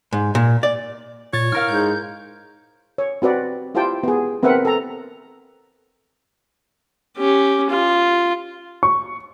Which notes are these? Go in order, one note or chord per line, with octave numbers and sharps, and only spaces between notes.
G#2
A#2
D5
A#2 C#5 A6
E4 A#4 F5 F6
G#2 G6
C#5
C4 F#4 B4 D5
E4 F4 G4 C5 G5 A5
B3 G#4
B3 C4 A#4 B4 E5 F#5
A4 A#5
C#4 G4
F4
C#6